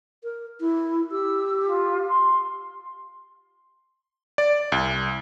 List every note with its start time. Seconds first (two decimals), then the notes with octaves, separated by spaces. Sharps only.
0.24 A#4
0.61 E4
1.11 G4 E6
1.66 F4
2.08 C6
4.38 D5
4.72 C2